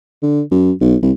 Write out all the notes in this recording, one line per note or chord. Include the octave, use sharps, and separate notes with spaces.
D3
F#2
B1
C2